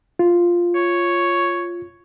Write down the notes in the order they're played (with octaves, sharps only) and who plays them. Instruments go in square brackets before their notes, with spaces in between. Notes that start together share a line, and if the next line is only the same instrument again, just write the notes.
[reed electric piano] F4
[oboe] C#5